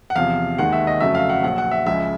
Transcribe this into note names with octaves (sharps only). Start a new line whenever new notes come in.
F#5
E2 C3 F3 F5
D#2 D#3 G#3 F#5
E5
D#5
F2 C#3 F#3 A3 E5
F5
F#5
A#1 A#2 F#3 F#5
F#5
E5
C#2 C#3 F3 G#3 E5